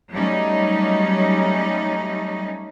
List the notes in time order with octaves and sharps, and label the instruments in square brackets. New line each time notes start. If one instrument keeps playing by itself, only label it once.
[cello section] F#3 G3 A3 C#4 D#4